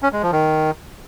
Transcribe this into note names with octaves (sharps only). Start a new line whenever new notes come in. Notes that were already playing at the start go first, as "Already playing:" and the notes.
C#4
G#3
F3
D#3